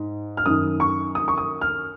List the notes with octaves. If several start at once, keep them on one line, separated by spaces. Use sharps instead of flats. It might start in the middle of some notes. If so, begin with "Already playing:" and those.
Already playing: G#2
F6
F#2 D#3 D#6
C#6
D#6
C#6
D#6
F6